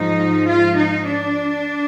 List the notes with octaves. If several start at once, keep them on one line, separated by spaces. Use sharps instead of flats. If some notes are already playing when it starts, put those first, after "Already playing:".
Already playing: G#2 F3 D#4
F4
D#4
D4